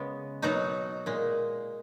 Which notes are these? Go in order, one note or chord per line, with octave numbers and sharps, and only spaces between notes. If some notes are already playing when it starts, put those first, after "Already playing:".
Already playing: C#3 G#3 B3
B2 F#3 D#4 F#4
A#2 G#3